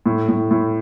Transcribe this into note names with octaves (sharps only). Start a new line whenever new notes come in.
A2
A2
A2